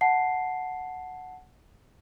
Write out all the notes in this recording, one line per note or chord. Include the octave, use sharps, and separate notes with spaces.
F#5 A5 C7